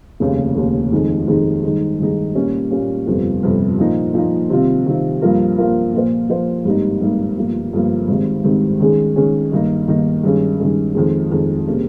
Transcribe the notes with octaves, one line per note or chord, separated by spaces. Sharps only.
F1 D#2 C#3
F1 D#2 C#3
F2 D#3 G#3 D#4 G#4
F2 D#3 G#3 D#4 G#4
G2 D#3 G#3 D#4
G2 D#3 G#3 D#4
A#2 G3 A#3 C#4
A#2 G3 A#3 C#4
G1 F2 C3 G3
G1 F2 C3 G3
A#2 F3 A#3 D#4
A#2 F3 A#3 D#4
C3 D#3 G3 C4 F4
C3 D#3 G3 C4 F4
G2 F3 A#3 F4 A#4
G2 F3 A#3 F4 A#4
A#2 F3 A#3 F4 C5
A#2 F3 A#3 F4 C5
G#1 G2 G3 A#3 D#4
G#1 G2 G3 A#3 D#4
G1 G2 F3 A#3
G1 G2 F3 A#3
G#1 G#2 D#3 G3 C4
G#1 G#2 D#3 G3 C4
D#3 G#3 C#4 G#4
D#3 G#3 C#4 G#4
G2 D#3 A#3 D#4
G2 D#3 A#3 D#4
G2 D#3 G#3 C#4 G#4
G2 D#3 G#3 C#4 G#4
F2 D#3 G#3
F2 D#3 G#3
C3 G3 A#3 C#4 G#4